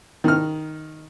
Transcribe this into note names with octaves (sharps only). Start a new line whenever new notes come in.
D#3 F6